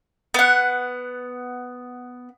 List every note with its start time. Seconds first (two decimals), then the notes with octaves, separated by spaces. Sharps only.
0.34 B3 F#5